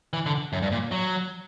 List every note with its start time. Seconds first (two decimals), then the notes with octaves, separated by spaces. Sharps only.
0.13 E3
0.26 D3
0.53 F#2
0.62 G2
0.72 A#2
0.92 F#3